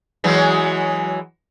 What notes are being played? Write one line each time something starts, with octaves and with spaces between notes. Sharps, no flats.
E3 F#3 G#3